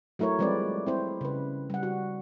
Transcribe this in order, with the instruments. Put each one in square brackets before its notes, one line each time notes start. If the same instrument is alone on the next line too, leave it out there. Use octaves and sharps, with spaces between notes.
[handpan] F#3 A3 E4 A#4 C#5
F3 G3 G#3 C4 B4 D5
C4 E4 C5
C#3 B4
G3 F#5
F#4